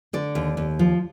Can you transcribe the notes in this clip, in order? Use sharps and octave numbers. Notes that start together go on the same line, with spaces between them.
D3 D5
D#2
D#2
F3